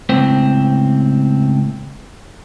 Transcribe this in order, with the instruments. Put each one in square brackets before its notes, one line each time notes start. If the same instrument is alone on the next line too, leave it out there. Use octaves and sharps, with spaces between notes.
[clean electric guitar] C#2 A2 C4